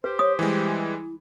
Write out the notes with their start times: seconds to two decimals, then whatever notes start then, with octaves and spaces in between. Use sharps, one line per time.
0.04 G4 B4 C5
0.19 C#5 D#6
0.39 E3 G3 G#3 E4